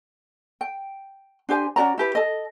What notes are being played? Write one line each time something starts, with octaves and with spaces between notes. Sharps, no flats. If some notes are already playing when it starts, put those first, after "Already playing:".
G5
D4 G4 C5 G#5
C#4 F#4 D5 A#5
E4 G4 B4
A4 D#5